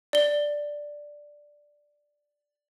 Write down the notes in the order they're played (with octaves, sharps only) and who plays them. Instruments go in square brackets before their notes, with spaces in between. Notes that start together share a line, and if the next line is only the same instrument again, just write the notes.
[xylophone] D5 G7